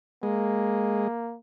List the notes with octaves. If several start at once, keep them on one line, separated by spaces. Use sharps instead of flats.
G#3 A#3